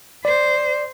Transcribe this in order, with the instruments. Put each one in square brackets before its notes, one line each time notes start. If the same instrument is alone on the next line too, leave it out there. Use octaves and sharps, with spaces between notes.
[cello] C5 [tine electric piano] D5